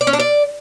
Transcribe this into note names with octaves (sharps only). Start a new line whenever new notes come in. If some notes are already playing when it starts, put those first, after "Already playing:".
D5
C#4
D4
D5